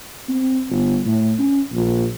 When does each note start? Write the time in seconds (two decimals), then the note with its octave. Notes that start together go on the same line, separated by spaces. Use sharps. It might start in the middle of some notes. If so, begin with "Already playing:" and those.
0.29 C4
0.71 G1
1.06 A2
1.40 C#4
1.73 A#1